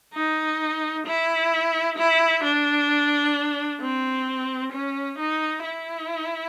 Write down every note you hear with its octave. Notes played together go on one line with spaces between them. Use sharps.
D#4
E4
E4
D4
C4
C#4
D#4
E4